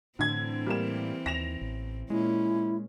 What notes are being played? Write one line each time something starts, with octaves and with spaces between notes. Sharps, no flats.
A2 D3 E3 C4 G#6
G3 A#3 E7
D#2 A#6 E7 F7
A1
A#2 G#3 C#4 E4